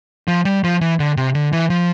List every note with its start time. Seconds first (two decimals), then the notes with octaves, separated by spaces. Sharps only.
0.28 F3
0.45 G3
0.64 F3
0.81 E3
0.99 D3
1.17 C3
1.35 D3
1.53 E3
1.70 F3